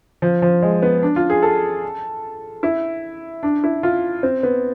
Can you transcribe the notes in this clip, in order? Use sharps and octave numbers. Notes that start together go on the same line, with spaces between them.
F3
F3
G#3
B3
D4
F4
G#4
A4
E4
D4
E4
F4
C4
B3